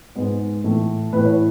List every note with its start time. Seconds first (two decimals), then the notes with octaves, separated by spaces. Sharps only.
0.16 G#2 G#3 B3
0.64 A2 E3 A3
1.13 A2 E3 A3 B4
1.25 C#5